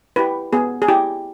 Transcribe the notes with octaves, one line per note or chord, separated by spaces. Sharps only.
E4 G4 B4
B3 G#4
G#4
E4 G4